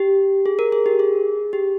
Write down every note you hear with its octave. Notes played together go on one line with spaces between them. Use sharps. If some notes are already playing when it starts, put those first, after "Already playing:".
Already playing: G4
G#4
A#4
G#4
G4
G#4
G4